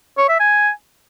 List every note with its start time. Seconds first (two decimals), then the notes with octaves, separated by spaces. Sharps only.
0.18 C#5
0.29 E5
0.40 G#5